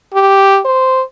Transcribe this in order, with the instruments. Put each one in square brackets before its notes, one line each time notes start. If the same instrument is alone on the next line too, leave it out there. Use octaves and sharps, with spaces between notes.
[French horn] G4
C5